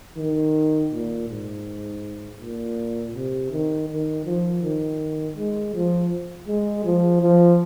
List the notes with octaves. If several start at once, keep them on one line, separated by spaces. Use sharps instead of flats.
D#3
A#2
G#2
A#2
C3
D#3
D#3
F3
D#3
G#3
F3
G#3
F3
F3